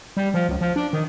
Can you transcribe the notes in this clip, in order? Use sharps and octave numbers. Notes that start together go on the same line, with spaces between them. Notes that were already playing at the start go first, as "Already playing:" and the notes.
G3
F3
C#2
F3
D4
D#3